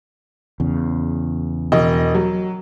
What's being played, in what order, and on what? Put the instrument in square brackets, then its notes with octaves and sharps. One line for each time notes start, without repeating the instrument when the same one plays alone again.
[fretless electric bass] E2 C#3
[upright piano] E1 D#5
F#3